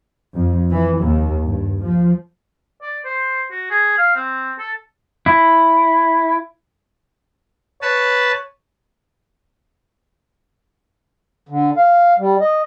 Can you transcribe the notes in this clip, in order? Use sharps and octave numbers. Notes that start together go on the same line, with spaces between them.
F2
E3
D#2
G2
F3
D5
C5
F#4
G#4
F5
C4
A4
E4
B4 C#5 A5
D3
F5
G3
D#5